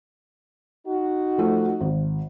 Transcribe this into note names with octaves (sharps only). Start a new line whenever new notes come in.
D#4 F#4
F3 A3
G#1